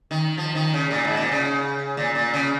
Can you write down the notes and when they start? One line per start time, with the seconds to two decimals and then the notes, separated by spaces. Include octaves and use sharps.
0.11 D#3
0.38 F3
0.55 D#3
0.74 C#3
0.91 A#2
1.04 G#2
1.17 A#2
1.31 C#3
1.97 A#2
2.15 A#2
2.34 C#3